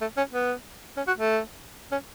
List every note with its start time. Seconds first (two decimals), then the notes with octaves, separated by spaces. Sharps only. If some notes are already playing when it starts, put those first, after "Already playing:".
0.01 A3
0.17 C#4
0.34 B3
0.97 C#4
1.07 F#4
1.18 A3
1.92 C#4